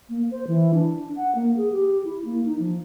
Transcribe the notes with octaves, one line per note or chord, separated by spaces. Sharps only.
A#3
C5
E3
D4
F#5
A#3
G#4
G4
E4
A#3
D#4
F3